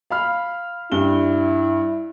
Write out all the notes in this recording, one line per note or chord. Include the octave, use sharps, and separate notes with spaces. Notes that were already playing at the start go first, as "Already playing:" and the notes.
F5 B5 F6
G2 E4 G7